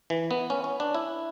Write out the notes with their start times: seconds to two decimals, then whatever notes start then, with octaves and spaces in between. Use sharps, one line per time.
0.10 E3
0.31 B3
0.50 C#4
0.64 C#4
0.80 D4
0.94 E4